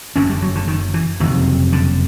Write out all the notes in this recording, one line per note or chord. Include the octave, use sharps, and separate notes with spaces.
F#1 F#2 D3 C#4
G3
F#3
D3
D#3
E3
F#1 F2 C3 D#3
D3